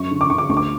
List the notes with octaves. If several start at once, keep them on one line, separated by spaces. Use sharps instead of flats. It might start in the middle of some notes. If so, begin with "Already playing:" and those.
Already playing: F#2 C#6
D3
D6
D3 C#6
D6
D2 C#6
D6